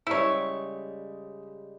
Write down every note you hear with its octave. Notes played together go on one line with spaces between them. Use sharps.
C#3 G3 G#3 E4 C#5